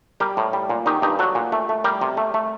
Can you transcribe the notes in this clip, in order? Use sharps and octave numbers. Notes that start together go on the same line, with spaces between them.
G3 G4 A#4
A2
G3
A#2
D#3 D#4 G4
G2 D#4 G4
F#3 F#4 A4
A#2
A3
A3
G3 G4 A#4
C3
A3
A3